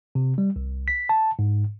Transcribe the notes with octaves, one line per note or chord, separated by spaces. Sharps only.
C3
G3
C2
B6
A5
G#2